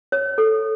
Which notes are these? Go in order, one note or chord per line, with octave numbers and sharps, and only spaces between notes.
C#5
A4